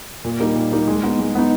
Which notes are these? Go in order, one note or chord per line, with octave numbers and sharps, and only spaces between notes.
A#2
G3 A#3 D#4
A#2
G3 A#3 D#4
G#3
B3 D#4
G#3
B3 D#4